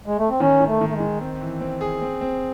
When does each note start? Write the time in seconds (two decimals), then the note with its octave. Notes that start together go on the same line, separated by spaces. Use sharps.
0.06 G#3
0.18 A3
0.29 C4
0.40 D#3 C#4
0.61 D#3
0.67 A3
0.81 D#3
0.89 A3
0.95 G#3
1.00 D#3
1.21 C4
1.41 E3
1.61 C4
1.81 G#4
2.02 C4
2.21 C4